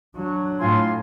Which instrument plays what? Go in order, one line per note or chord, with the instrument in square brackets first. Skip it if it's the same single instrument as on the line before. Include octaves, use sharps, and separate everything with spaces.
[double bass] F#3 D4
[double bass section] A2 [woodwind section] F4 G#5 C6